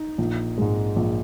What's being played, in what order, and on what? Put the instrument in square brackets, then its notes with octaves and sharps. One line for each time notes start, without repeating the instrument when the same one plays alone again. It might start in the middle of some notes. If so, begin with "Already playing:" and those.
Already playing: [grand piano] D#4
A#1
G#2 G#3
A#1